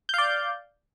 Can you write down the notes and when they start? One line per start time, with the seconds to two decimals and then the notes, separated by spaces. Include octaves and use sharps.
0.09 G6
0.14 F5
0.18 D5